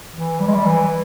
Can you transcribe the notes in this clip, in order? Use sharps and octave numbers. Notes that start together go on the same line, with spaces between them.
E3
G3
G#3
G3
E3